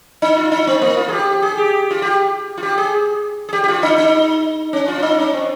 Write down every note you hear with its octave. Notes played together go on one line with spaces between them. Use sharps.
D#4
F4
D#4
C4
A#3
F4
G#4
G4
G#4
G4
F4
G4
F4
G4
G#4
G#4
G4
G4
F4
D#4
D#4
C#4
F4
C#4
D#4
C#4
C4